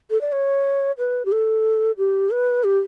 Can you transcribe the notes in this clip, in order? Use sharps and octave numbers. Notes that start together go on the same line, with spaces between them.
A4
D5
C#5
B4
G4
A4
G4
B4
G4